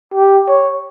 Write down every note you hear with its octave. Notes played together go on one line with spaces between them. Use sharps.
G4
C#5